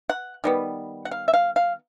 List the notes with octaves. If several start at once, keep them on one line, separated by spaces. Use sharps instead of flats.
F#5
D#3 G3 B3
F#5
F5
E5
F5
F5